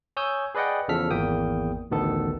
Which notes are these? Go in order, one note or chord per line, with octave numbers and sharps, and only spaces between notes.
C#5 G#5 D#6 E6 G6
G#4 B4 D5 D#5 F#5 G5
E2 C#3 F3 A4 F6 B6
G#1 E2 A#3 G5 D#6
A1 D2 D#3 B3 A4